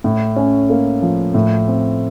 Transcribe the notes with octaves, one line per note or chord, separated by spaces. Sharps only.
A2
C#4
A#3
F3
A2
C4